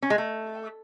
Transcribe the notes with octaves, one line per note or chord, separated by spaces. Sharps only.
C#4
G#3
A3